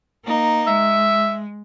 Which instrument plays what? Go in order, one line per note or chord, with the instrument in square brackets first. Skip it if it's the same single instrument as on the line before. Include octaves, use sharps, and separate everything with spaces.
[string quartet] A#3 D#4
[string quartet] G#3 [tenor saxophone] E5